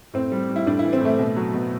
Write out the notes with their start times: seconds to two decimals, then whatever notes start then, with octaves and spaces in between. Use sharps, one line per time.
0.14 A2 C4
0.32 G3
0.49 G3
0.56 E4
0.66 A2 D4
0.79 E3 E4
0.93 C4
1.01 A2 A3
1.19 B2
1.36 F#3
1.54 B2